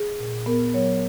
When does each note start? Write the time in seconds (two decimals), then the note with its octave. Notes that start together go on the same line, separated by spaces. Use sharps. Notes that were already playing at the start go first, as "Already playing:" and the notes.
Already playing: G#4
0.19 A#2
0.46 B3 A#4
0.74 F#3 C#5